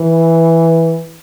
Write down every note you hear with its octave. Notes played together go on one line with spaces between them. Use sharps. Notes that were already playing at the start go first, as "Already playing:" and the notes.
Already playing: E3